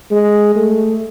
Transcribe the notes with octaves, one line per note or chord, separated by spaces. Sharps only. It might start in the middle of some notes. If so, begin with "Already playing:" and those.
G#3
A3